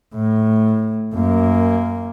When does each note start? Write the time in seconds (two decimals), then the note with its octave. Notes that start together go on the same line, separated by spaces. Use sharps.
0.15 A2
1.14 F#2 A#3